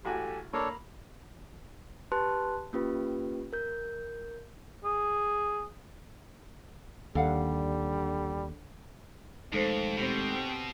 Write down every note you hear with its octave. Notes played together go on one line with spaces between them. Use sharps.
A1 F#4 G4 A4 G#5
A#3 D4 A4 C#5 A#5 B5
G4 B4 A5 C6 F#6
A#3 C#4 F4 G4 B4
A#4 G6
G#4
D#2 D3 G3 A4 F5 F#5
D#1 F2 G#3 A3 D#4 A4 C5
B2 C4 G4